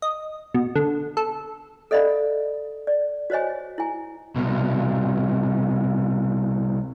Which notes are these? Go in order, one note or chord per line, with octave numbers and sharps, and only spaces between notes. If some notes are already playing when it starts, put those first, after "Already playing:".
D#5
B2
D3
A4
A4 D5 D#5 F5 B5
D5
F#4 C5 C#5 D#5 G#5
E4 G#5
C2 B2